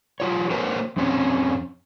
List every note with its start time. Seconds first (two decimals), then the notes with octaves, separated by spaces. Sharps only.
0.20 F#3 F4 C#5
0.50 A#3 F#4 A#4 C5 C#5 G5
0.96 F2 C4 C#4